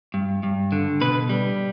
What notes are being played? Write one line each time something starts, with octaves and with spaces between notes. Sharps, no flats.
G2
G2
D3
B2 B4
G3